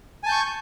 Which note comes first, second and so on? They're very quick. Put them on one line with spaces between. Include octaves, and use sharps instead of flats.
G#5 A5 G6 C#6